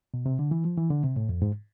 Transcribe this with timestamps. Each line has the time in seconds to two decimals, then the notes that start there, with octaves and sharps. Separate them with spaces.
0.14 B2
0.26 C3
0.39 D3
0.51 E3
0.65 F3
0.78 E3
0.90 D3
1.03 C3
1.16 A2
1.29 F2
1.42 G#2